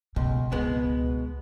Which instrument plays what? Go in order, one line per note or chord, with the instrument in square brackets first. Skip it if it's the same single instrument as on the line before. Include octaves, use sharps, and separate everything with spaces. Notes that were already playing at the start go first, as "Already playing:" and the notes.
[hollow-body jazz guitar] C#2 [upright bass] B2
[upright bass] D1 C#2 [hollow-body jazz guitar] B2 G#3 B3